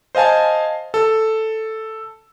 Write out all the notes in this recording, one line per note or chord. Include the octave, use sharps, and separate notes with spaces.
C5 D#5 F5 G#5 A5
A4